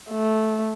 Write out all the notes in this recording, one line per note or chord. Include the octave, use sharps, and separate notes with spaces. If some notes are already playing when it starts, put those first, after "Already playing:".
A3